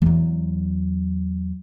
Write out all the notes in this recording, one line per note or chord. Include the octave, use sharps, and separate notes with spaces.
E2 F#3